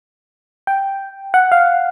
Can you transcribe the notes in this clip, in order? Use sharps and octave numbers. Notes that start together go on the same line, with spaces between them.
G5
F#5
F5